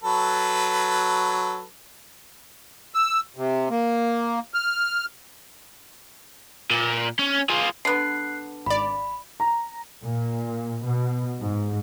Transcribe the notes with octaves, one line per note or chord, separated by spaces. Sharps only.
F#3 A4 B4
E6
C3
A#3
F6
A#2
C#4
F4 G#4
D3 B3 F#6 C7
G#1 D5 B5
A#5
A#2
B2
G#2